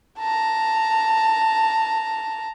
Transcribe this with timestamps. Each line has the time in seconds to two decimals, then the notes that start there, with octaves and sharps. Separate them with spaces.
0.19 A5 A#5